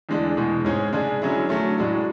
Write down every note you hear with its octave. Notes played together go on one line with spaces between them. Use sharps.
E2 D3 G#3 D4
E2 B2 G#3
G#2 G#3 C#4 G#4
C#3 G#3 D4 G#4
D3 F#3 C#4 E4 G#4
D3 F#3 A3 C#4
A2 G#3 D4 F#4